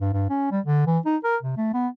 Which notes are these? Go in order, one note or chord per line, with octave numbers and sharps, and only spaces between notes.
G2
G2
C#4
G3
D3
E3
D#4
A#4
C3
A3
B3